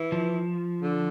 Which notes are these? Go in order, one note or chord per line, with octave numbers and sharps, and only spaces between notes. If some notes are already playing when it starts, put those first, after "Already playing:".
Already playing: E3
F3
D3